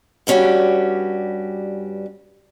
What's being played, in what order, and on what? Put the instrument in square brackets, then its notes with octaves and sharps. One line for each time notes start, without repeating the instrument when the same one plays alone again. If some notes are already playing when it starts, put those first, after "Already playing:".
[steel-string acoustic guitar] G2 G3 C#4 F#4 G4